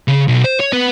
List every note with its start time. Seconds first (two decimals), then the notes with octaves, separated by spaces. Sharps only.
0.08 C#3
0.28 B1
0.44 C5
0.60 C#5
0.73 B4 F#5